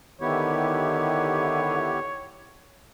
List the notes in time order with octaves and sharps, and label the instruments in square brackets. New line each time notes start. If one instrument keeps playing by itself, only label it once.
[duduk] D3 [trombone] D#3 [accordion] B3 E4 G4 [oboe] C#5